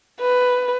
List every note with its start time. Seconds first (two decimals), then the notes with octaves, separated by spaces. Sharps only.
0.20 B4